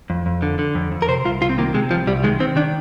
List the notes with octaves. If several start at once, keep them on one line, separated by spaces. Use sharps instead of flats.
F2
F2
D3
D3
F2
F2
A#4
C3 C5
C2 F4
C2 F4
C4
D#3 A#3
C3 G#3
C2 F3
C2 G3
D#3 G#3
D#3 C4
D#3 D4